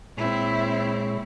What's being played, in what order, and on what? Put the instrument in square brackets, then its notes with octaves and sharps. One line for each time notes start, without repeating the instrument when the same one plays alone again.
[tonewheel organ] A#2 G#3 C#5 [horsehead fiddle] C4 E4